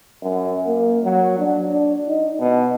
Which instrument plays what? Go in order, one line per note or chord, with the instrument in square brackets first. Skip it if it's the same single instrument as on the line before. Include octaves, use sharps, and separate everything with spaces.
[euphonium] F#2
A#3
F#3
D4
D4
D#4
B2